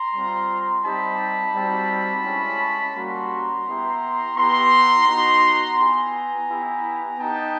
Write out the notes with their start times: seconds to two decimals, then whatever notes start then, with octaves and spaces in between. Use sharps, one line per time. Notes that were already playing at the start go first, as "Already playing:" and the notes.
Already playing: A#5 C6
0.13 G3 C4 F4
0.84 G3 C4 D#4 G4 A5 B5
1.55 G3 C4 D#4 F#4
2.25 G#3 C#4 E4 G4
2.95 G3 A#3 C#4 F#4 A#5 C6
3.66 B3 E4 G4
4.36 B3 E4 G4 A#5 C6
5.07 B3 D#4 F#4
5.77 B3 E4 G4 G#5 A#5
6.49 B3 E4 G4
7.19 B3 D#4 G4 G5 A5